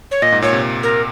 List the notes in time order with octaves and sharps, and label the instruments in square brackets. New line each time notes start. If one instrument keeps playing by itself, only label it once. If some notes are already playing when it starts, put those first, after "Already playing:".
[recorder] C#5
[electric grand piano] A#2 [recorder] D#5
[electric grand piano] G#2
[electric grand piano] A#2 [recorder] C#5
[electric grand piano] C3
[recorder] A#4